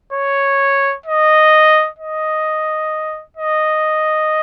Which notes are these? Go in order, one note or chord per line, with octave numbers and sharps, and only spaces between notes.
C#5
D#5
D#5
D#5